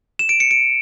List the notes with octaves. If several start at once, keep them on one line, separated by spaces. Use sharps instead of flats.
E7
D7
C#7
D7